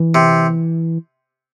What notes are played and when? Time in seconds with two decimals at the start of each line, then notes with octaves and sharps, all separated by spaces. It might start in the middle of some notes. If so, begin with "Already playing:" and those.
Already playing: E3
0.15 C3